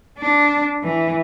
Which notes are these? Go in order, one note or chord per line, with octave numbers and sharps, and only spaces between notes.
D4
E3